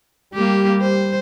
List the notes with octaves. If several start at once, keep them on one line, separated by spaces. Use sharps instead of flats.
G3 A#3 G4
C5